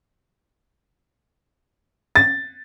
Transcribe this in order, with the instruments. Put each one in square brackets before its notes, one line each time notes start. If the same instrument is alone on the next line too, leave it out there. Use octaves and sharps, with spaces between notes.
[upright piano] A6